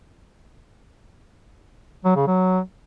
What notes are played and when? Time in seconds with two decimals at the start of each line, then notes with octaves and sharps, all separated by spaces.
2.05 F#3
2.16 C#3
2.27 F#3